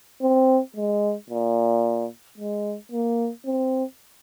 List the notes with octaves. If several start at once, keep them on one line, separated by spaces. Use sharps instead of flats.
C4
G#3
A#2
G#3
A#3
C4